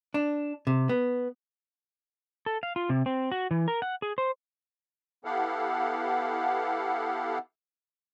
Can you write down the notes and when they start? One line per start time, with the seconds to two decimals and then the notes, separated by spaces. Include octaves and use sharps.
0.14 D4
0.67 C3
0.89 B3
2.46 A4
2.63 F5
2.76 F4
2.89 C3
3.06 C4
3.32 F#4
3.51 E3
3.68 A#4
3.82 F#5
4.02 G#4
4.18 C5
5.25 B3 E4 G4 A4 F5 F#5